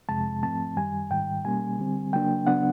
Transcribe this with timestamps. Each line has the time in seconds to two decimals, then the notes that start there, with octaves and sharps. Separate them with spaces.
0.09 F2 C3 F3 G#3 A5
0.43 G#2 F3 A3 C4 A5
0.77 F#2 D#3 G3 G#5
1.11 G#2 D#3 G3 G5
1.45 B2 G3 A#3 C#4 G#5
1.79 D3 G3 C4
2.13 C#3 F#3 A#3 D4 G5
2.47 C#3 F#3 B3 D4 F#5